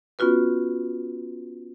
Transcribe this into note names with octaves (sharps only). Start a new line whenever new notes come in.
B3 C#4 F4 F#4 B4